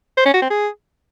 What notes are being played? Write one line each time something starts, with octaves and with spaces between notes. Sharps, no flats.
C5
C#4
F#4
C4
G#4